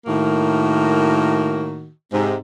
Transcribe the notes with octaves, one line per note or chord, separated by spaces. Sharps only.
A2 D#3 A#3 F#4
G#2 C3